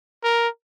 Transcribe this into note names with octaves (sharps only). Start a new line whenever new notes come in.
A#4